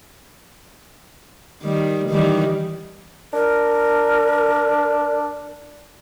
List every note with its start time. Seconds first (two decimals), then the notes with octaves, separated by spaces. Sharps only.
1.62 D#3 G3
2.09 D#3 E3 G3
3.33 D4 A#4